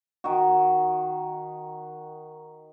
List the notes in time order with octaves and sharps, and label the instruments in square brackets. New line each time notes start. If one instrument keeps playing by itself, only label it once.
[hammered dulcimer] D#3 F#4